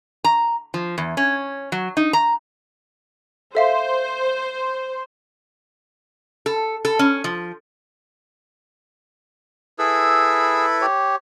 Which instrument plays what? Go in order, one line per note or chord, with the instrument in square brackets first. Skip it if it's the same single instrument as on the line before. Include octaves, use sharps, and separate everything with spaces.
[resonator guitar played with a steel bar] A#5
F3
E2
C#4
F#3
D#4
A#5
[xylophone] A4 E5 F5 [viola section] C5
[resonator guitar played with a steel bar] A4
A4
C#4
F3
[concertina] E4 A4 B4 [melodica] G#4 E6
[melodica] G4 C#5